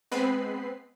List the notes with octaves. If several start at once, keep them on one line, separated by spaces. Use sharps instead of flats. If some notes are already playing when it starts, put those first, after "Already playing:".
G#3 B3 C4 B4 B5 C7